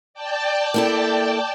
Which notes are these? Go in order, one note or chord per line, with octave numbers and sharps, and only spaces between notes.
D5 G5 A5
A#3 E4 A4